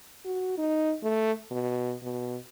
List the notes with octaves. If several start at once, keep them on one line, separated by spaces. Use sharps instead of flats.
F#4
D#4
A3
B2
B2